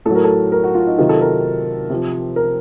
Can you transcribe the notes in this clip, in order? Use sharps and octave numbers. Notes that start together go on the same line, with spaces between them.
A2 F#3 A4
A#4
A4
A#4
F#4
F4
D#4
C3 D#3 F#3 F4
A4
A#4
C3 F3
A#4